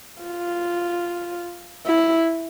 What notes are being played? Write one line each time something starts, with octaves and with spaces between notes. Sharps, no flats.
F4
E4